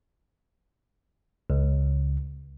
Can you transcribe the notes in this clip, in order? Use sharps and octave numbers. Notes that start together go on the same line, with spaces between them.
C#2